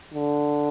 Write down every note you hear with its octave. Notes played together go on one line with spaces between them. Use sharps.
D3